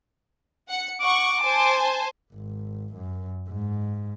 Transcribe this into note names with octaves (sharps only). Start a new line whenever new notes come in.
F#5 C#7
F#5 C#6 D6
C5 G#5 A5
G#1
F#2
G#2